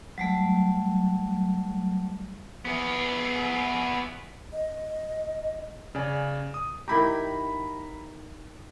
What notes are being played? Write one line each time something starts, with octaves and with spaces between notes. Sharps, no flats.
F#3 G3 A3
B3 G#4
D#5
C#3 D5 G#5
D#6
D#3 E4 G4 A#5 B5